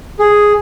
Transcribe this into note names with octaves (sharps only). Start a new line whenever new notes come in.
G#4